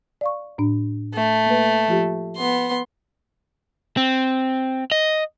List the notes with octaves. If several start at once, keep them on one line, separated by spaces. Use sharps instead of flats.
D5 F5 C#6
A2 D4
A3
A#3 B4
F3 F4 G4
B3 C6
C4
D#5